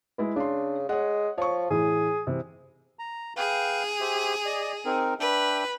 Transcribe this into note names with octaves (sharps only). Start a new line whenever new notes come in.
G#3 E4 B4
C#3 D4 C6
G#3 C#5 D#5 F#5
F3 C#5 C#6
A2 E3 G#4
C3 E3
A#5
G#4 B4 F5 G5
G4 C5 E5
D5 D#5
C4 D#4 A#4
D4 B4 E5 G5